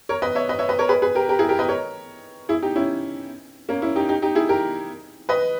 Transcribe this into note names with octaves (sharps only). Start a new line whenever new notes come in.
A#4 C#5
B4 D#5
C#5 E5
B4 D#5
C#5 E5
B4 D#5
A#4 C#5
G#4 B4
G#4 B4
G4 A#4
G4 A#4
E4 G#4
G4 A#4
B4 D#5
A#4 C#5
E4 G#4
D#4 G4
C#4 E4
A#3 C#4
C#4 E4
D#4 G4
D#4 G4
D#4 G4
E4 G#4
G4 A#4
B4 D#5